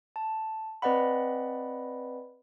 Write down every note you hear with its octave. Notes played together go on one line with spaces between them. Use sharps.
A5
C4 B4 D5 D#5 F#5 B5